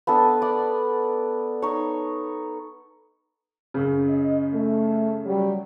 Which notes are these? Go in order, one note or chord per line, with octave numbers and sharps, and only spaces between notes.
B3 D4 A4 A5
D5 F#5
D#4 C#5
F#2 C#3
D#5
A3
F#3 G3